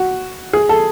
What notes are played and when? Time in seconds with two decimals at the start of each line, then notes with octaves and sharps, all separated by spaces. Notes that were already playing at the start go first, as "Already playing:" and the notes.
Already playing: F#4
0.53 G#4
0.69 A4